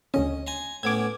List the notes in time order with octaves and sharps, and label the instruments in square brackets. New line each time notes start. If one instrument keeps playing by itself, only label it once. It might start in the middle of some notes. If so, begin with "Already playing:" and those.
[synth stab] D2 D3 C#4 [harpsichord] D#5
[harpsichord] G#5 A#5 C6
[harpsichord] A2 B3 C#4 [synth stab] D6 G#6